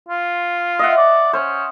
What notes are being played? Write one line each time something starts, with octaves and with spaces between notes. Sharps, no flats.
F4
D#5 E5 F#5
D5
C#4 C5